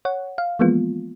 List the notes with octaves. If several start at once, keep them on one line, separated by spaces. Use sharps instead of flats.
C#5 F#5
F5
E3 F3 G#3 A#3 B3 F4